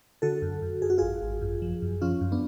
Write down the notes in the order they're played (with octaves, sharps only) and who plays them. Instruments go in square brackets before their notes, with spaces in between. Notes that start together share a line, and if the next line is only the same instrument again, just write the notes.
[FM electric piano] D3 F#4 A4
F#2
F#2
F#2 G#4
F#4
G#1 F4 G#4
G#1
F#2
F3
F#2
F3 C#4 F4
F#2
B3 D4